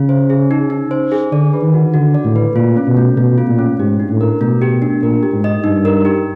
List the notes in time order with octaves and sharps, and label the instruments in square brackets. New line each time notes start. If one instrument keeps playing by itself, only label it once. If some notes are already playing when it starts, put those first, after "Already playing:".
Already playing: [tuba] C#3 [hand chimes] F4
[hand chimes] C5
G#4
D#4
D#4
C5
G#4
[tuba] D3 [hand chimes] D5
[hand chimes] B4
[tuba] D#3
[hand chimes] F#4
[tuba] D3 [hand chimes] F#4
[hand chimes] D5
[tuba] A2
[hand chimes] B4
[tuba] A#2 [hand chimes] F4
[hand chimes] C#4
[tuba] B2
[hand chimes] A3
[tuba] B2 [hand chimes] A3
[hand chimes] F4
[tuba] A#2
[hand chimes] C#4
[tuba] G#2 [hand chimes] G4
[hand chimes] D4
[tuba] A2
[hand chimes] A#4
[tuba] B2 [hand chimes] A3
[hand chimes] G4
D4
[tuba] A#2 [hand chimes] A#4
[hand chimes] G4
[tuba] G#2
[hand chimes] D#5
[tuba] G2 [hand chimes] D#4
[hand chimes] A#4
G4